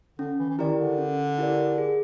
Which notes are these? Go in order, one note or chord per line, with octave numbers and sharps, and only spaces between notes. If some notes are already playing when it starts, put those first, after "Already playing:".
D3 C#4
E3
E3
D#3 E4 G4 A#4 D5
D3
C#4
E4 G4 A#4 D5
G#4